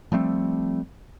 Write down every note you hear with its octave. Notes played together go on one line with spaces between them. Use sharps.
F3 G3 A3 C4